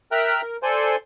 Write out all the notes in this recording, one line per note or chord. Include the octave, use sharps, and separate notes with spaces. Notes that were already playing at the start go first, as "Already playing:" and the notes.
A#4 E5 G5 A#5 F6 F#6
A#4
A4 C5 D5 G#5 C6